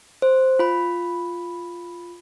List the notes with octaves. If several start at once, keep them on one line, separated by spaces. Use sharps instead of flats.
C5
F4 B5